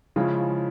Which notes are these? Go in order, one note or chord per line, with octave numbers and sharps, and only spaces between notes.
C#3 F3 G#3 C#4 E4